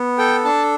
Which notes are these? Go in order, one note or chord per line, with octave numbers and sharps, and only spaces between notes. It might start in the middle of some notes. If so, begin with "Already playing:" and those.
Already playing: B3
A4 G5
D4 A5